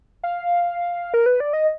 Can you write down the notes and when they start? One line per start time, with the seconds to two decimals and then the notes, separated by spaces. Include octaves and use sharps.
0.23 F5
1.14 A#4
1.26 B4
1.40 D5
1.53 D#5